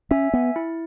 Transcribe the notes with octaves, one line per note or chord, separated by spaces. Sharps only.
C#4 E5 G#5
B3
E4